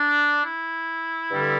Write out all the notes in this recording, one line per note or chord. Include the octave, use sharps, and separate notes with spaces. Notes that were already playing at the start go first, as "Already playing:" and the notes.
Already playing: D4
E4
G2 D3 G3